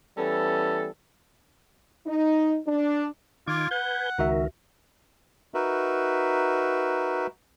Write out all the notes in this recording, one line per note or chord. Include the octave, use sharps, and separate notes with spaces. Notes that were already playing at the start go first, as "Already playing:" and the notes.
E3 G3 B3 C#4 A4
D#4
D4
D#3 F4 D6 G#6
B4 F#5 G#5 G6
C#2 D#3 F#4 A#4 E5
D#4 F#4 A#4 B4 E5